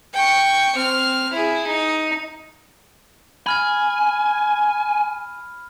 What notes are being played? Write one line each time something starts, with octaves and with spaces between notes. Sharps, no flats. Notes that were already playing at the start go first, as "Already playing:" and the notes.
G5 C#6
C4 F6
E4 G#4
D#4
G#5 B5 F6 G#6